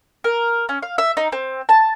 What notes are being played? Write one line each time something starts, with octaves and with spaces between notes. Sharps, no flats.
A#4
C#4
F5
E5
D#4
C4
A5